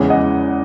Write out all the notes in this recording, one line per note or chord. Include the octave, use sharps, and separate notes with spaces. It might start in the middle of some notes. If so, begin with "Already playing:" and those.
Already playing: E2 C#3 E3 G#3 C#4
D#5 F#5